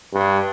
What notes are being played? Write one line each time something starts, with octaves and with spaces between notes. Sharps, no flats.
G2